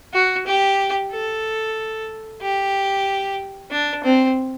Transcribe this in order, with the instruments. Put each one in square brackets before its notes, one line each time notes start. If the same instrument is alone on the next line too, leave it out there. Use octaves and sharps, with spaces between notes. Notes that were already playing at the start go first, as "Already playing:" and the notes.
[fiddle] F#4
G4
A4
G4
D4
C4